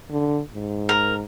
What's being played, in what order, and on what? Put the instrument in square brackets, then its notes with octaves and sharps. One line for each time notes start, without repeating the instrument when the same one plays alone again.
[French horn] D3
G#2
[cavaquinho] A#4